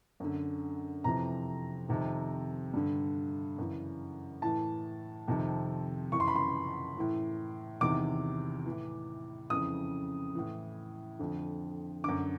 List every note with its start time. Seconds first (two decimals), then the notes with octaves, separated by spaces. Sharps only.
0.20 F#2 D3
1.04 F2 C3 E3 A#5
1.89 F2 C3 D#3
2.73 G2 D3
3.58 F#2 C#3 E3
4.42 A2 E3 A5
5.28 F2 C3 D#3
6.12 F#2 C#3 E3 C#6
6.20 C6
6.28 B5
6.35 C6
6.97 A2 E3
7.81 E2 C3 D#3 D6
8.66 A2 E3
9.50 F2 C#3 E3 D#6
10.35 A2 E3
11.19 F2 D3
12.04 F#2 D3 D6